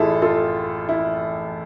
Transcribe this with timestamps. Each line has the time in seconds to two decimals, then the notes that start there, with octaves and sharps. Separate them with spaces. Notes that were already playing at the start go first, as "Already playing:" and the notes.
Already playing: A1 A2 E4 F4 G#4 A4
0.22 F4 A4
0.89 E4